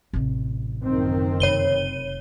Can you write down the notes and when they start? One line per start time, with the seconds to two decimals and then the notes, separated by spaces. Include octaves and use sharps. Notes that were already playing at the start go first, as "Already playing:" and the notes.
0.13 A1 C3
0.83 F#1 D#3 C4
1.40 F1 C#5 D#7 G7